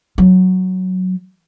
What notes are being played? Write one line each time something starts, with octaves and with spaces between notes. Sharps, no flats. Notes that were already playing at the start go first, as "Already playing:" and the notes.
F#3